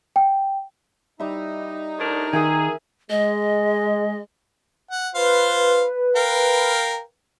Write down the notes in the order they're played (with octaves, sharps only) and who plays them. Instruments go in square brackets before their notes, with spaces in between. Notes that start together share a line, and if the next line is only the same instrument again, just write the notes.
[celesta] G5
[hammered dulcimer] G3 E5 [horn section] D#4
[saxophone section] A2 D4 A#4
[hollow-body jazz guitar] D#3 [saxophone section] G#4 [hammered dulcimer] A#4 E5 G#5
[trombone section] G#3 [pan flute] D#5
[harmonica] F#5
[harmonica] F4 C5 F5 [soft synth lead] B4
[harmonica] A#4 F5 G5